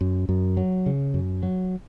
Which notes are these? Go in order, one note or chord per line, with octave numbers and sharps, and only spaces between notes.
F#2
F#2
F#3
C#3
F#2
F#3